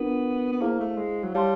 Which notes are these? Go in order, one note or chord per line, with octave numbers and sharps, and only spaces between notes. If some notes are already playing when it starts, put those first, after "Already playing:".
Already playing: B3 D4 F4 A#4
B3
A#3 E4 G#4 C5 F5
A3
G#3
F#3
G3 C#5 F5 A5 C6